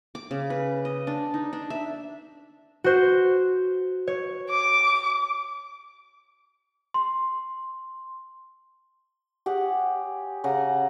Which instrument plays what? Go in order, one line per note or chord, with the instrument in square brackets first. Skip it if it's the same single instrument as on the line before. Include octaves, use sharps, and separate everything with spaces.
[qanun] D6
C#3
B4
D#5
D4
D#4
D4
E5
[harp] F#4 C5
C#5
[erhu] D6
[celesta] C6
[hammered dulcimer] G4 G#4 C#5 F#5
C#3 F#5 G#5 A#5